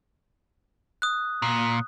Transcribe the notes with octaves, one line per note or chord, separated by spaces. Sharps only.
D#6 F#6
A#2